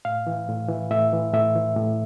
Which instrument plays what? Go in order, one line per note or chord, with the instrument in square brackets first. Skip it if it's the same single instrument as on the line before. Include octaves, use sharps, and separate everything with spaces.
[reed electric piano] A2 F5
E3
A2
E3
A2 E5
E3
A2 E5
E3
A2